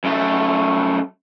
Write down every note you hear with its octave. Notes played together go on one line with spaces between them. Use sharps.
F#2 A3